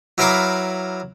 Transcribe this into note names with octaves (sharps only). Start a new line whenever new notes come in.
F#3 E4 A#4 B4 F5 D6